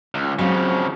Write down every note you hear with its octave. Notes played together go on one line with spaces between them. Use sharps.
C#2
C#3 F3 F#3 C4